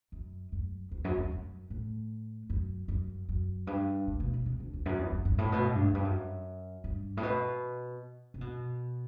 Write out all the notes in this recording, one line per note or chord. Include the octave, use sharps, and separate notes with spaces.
F#2
F#2
E2
F#2
E2
F#2
A2
F#2
F#2
F#2
G2
A2
B2
B2
C3
D3
E2
F#2
E2
F#2
G2
A2
B2
A2
G2
F#2
G2
F#2
G2
A2
B2
C3
B2